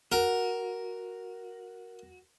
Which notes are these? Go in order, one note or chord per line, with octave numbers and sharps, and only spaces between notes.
F#4 A#4